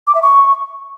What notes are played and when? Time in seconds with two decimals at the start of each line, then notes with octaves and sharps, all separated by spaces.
0.07 D6
0.15 E5
0.23 C#6